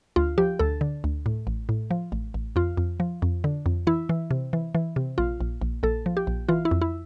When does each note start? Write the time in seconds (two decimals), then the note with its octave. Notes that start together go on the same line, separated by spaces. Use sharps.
0.16 D2 F4
0.38 F3 G4
0.59 D2 A4
0.81 D3
1.04 D2
1.26 A2
1.47 A1
1.69 A2
1.91 F3
2.12 A1
2.34 A1
2.56 F2 F4
2.77 F2
3.00 F3
3.22 F2
3.44 D3
3.66 F2
3.87 E3 E4
4.09 E3
4.31 C3
4.53 E3
4.75 E3
4.96 C3
5.18 A#1 F4
5.41 A#1
5.61 A#1
5.83 A#1 A4
6.06 F3
6.17 G4
6.27 A#1
6.49 E3 F4
6.65 E4
6.71 F2
6.82 E4